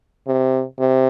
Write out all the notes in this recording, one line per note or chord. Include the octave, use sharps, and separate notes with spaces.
C3
C3